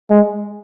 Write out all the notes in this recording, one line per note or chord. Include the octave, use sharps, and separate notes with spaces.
G#3